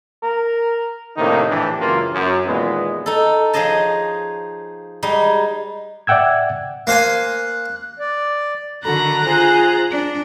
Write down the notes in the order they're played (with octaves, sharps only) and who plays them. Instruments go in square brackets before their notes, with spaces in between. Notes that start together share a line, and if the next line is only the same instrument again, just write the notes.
[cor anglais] A#4
[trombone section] A2 C3 D#3 A#3 D4 D#4
A#1 A2 E3 D4 G4
C#2 F#2 E3 A#3 F4
F#2
D#2 A#2 E3 G#3 B3
[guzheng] D#4 A4
F3 D#4 G#4 C#5 D#5 A5
G3 G#3 D#4
[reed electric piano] D5 E5 F#5 G5 E6 G#6
[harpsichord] A#3 C5 G#5 [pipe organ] F#6
[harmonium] D5
[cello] D3 D#3 [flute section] F#4 A4 B5 [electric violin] A#5 F#6
[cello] F4 [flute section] G#4 C5 G#5
[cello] D4 [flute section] D5